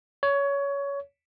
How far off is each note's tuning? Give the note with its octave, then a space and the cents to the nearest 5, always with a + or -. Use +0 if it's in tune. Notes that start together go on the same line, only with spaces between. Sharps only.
C#5 +20